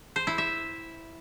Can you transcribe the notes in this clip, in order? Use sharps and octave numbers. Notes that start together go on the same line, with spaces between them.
C5
E4
E5